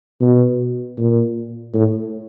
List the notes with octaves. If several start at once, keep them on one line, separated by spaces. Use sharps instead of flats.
B2
A#2
A2